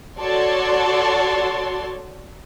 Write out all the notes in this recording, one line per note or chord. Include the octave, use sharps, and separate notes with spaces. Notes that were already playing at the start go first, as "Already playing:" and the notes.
F#4 A4 C#5 D5 A5 C6